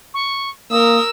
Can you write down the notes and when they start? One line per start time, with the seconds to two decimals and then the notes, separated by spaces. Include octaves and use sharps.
0.14 C#6
0.71 A#3 A#4 D#6 E6